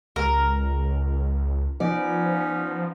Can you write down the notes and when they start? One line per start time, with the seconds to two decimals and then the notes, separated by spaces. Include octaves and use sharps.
0.16 C#2 A#4
1.80 F3 B3 C#4 D#4 D5